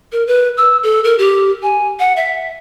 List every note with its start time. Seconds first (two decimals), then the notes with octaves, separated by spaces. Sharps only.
0.12 A#4
0.27 B4
0.57 E6
0.83 A4
1.04 A#4
1.18 G4
1.63 G#5
1.99 F#5
2.16 E5